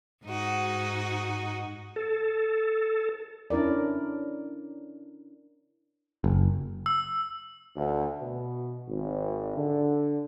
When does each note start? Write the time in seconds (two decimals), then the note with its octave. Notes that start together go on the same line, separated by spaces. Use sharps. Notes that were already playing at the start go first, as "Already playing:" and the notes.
0.25 G#2 D#4 F#4
1.96 A4
3.50 C#4 D4 E4 A#4 D5
6.24 F#1
6.86 E6
7.76 D2
8.20 B2
8.88 G#1
9.56 D3